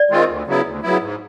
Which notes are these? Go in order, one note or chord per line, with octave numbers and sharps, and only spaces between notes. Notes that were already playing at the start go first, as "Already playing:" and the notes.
Already playing: D5
D#3 G#3 C4 F4
D2
C#3 F#3 B3 E4
D2
C#3 F#3 B3 E4
G#2